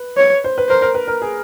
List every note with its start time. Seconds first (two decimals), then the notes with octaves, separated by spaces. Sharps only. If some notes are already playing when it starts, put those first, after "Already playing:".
Already playing: B4
0.17 C#5
0.44 C5
0.58 B4
0.69 A#4 C5
0.82 A#4
0.95 B4
1.08 A#4
1.22 G#4